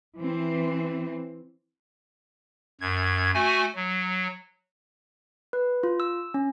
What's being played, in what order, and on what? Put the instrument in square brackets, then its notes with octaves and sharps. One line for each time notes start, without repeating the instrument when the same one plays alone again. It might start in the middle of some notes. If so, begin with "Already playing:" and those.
[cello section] E3 C4
[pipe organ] F#2 G#6
A3 F#4 G#5
F#3
[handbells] B4
F4
E6
C#4